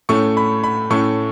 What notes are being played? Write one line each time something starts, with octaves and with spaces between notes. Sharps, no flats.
A2 A3 C#4 C#6
B5
B5
A2 A3 C#4 C#6